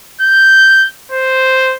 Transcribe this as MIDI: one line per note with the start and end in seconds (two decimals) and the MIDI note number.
0.21 0.87 91
1.12 1.75 72